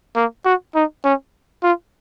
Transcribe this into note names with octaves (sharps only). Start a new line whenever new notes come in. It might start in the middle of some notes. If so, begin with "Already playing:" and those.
A#3
F#4
D#4
C#4
F4